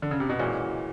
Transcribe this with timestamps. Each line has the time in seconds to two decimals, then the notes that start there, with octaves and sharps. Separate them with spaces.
0.02 D3
0.11 C#3
0.20 C3
0.29 B2
0.39 A#2 E3 G#3 C#4 F#4